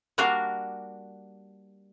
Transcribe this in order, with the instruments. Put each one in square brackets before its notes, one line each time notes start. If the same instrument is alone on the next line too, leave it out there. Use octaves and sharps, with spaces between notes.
[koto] G3 A#3 D4 F#4 A#4 F5